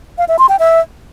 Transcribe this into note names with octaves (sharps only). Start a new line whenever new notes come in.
F5
E5
C6
G5
E5